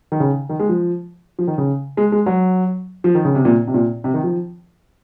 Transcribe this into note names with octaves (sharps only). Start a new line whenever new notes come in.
D#3
C#3
D#3
G#3
F3
F3
D#3
C#3
G#3
G#3
F#3
F3
D#3
C#3
C3
A#2
C3
A#2
C3
D#3
F3